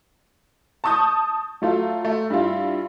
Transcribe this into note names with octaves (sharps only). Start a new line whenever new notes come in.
A5 C#6 D#6 G6
F#3 A3 F4
A3
G2 E4 F4